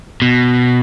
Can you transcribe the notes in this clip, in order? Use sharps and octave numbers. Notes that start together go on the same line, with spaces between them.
B2